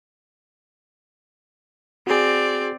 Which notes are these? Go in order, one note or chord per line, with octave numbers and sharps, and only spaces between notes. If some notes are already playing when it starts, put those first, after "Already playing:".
C4 F#4 G#4 D5